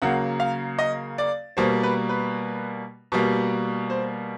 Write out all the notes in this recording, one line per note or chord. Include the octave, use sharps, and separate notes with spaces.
C#3 F#3 A#3 F#5
F5
D#5
D5
B2 G3 A#3 C5
B4
B4
B2 G3 A#3
C5